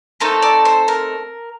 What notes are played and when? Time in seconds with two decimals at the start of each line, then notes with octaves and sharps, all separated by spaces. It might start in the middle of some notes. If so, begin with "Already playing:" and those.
0.20 A3 C4 D#4 A4 A#4
0.42 D5
0.65 C5
0.88 A#4